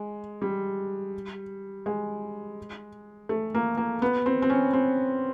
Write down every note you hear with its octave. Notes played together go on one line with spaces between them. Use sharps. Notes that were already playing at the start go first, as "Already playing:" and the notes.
Already playing: G#3
G3
G#3
A3
A#3
A#3
B3
C4
C4
C#4
C4